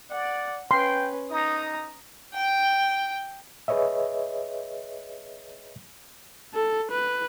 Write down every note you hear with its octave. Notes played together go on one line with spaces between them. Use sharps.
D5 F#5
C#4 B4 G5 C6
D#4 A#5 D#6
G5
G#4 B4 C#5 D#5 E5
A4
B4